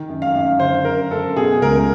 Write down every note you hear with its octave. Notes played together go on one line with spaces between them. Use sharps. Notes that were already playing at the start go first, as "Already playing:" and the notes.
Already playing: D#3
F#2
F5
F#2
D3 C5
F#2 A#4
F#2 A4
B2 G#4
C#2 A#4